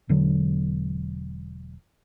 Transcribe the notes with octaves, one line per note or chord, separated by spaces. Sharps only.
E1 D3 F#3